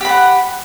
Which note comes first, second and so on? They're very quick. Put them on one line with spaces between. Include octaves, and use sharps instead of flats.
G4 B5 F#5